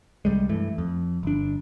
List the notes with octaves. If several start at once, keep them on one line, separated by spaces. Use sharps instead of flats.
C2 G#2 G3 G#3
G2 E3 A3
F2
G1 D4